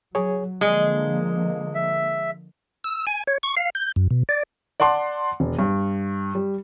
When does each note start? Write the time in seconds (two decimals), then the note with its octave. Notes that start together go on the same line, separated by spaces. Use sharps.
0.15 F#3 G#4 C#5
0.61 D3 F3 G#3 A#3 D#5
1.75 E5
2.84 E6
3.07 G#5
3.27 C#5
3.43 C#6
3.57 F5
3.75 G6
3.96 F#2
4.11 B2
4.29 D5
4.80 D5 F#5 A5 C6 D6
5.40 E1
5.59 G2
6.35 G3